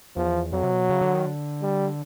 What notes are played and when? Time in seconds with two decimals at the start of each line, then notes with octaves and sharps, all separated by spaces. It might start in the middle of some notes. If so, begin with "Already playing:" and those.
0.16 E2 F3
0.53 F2 F#3
0.63 C3
0.71 B2
0.89 C#3
1.01 D3
1.14 D#3
1.26 D3
1.62 G3